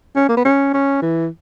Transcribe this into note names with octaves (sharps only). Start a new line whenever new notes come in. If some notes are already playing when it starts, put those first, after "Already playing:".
C#4
A#3
B3
C#4
C#4
E3